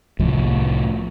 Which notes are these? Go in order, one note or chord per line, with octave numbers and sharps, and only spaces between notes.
C2 A2 F3